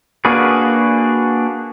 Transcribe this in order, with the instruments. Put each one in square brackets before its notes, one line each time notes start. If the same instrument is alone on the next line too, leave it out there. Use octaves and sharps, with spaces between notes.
[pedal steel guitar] A#3 D4 F#4 G#4 B4